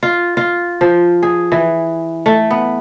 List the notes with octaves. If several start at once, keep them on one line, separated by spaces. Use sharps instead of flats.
F4
F4
F3
G#4
E3
A3
B3